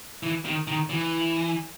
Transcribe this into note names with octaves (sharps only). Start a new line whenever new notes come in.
E3
D#3
D#3
E3